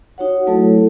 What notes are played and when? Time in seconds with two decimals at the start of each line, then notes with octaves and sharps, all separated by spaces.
0.18 D#4 F#4 C#5 F#5
0.47 F#3 A3 E4 A4